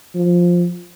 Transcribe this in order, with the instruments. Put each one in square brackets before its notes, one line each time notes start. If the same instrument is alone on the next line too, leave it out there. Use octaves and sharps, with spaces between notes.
[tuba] F3